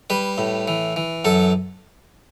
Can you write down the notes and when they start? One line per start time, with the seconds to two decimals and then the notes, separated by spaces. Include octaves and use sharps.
0.10 G3 B4
0.38 A2
0.68 E3
0.96 E3
1.25 F#2 A4